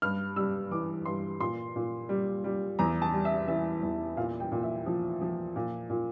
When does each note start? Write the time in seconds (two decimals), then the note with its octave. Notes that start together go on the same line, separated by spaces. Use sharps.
0.02 G2 F6
0.36 G3 E6
0.71 E3 D6
1.06 G2 C6
1.40 A#2 C6
1.76 A#2
2.09 G3
2.44 G3
2.79 E2 A#5
3.02 A5
3.13 G3
3.25 E5
3.48 E3 E5
3.83 E2
4.17 A#2 F5
4.40 G5
4.52 A#2
4.63 E5
4.86 F3
5.21 F3
5.56 A#2
5.90 A#2